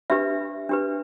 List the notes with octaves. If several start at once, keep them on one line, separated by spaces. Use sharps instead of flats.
D4 G4 B4 E5
D4 G4 B4